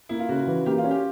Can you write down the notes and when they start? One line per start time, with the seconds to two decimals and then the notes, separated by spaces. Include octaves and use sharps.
0.09 A#3 E4
0.19 F4
0.29 C#3 F#4
0.47 E3
0.66 A#3 G4
0.78 F4
0.84 C#4
0.91 G4